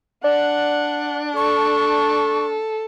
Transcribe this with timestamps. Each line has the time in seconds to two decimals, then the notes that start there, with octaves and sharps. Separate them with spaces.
0.24 D4 D5 F#5
1.36 A4 C#6